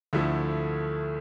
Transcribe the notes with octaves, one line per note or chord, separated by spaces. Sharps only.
D2 D3 F3 A3 E4